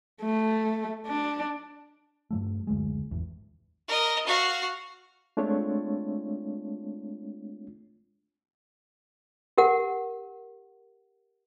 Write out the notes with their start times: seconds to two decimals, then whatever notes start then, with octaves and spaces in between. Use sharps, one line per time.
0.22 A3
1.06 D4
2.30 G2 F3 A3
2.67 F#1 D2 G#3
3.11 G#1 E2
3.88 A#4 D#5
4.27 F#4 F5
5.37 G#3 A3 C4 D4 F4 C#5
9.58 G4 A#4 F#5